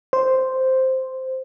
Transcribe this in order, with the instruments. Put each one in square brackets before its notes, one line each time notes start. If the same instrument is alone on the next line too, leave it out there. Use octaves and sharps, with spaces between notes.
[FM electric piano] C5